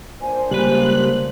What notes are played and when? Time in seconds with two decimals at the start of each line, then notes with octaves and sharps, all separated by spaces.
0.22 A#2 D4 C5 G#5
0.51 C#2 G3 A#3 B4 F#6